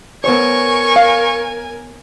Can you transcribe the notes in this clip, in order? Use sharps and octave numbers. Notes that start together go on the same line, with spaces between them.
B3 A#4 C5 C#5 G#5 C#6
F5